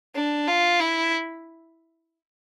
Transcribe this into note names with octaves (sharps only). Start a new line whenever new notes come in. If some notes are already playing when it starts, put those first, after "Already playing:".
D4
F4
E4